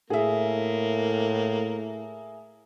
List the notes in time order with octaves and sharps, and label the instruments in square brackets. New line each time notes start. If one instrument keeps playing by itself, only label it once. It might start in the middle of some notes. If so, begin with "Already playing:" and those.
[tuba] A2 [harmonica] A#3 [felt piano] G#4 E5